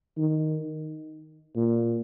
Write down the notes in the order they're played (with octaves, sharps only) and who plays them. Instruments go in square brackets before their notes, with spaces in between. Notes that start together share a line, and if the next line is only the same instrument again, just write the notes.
[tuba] D#3
A#2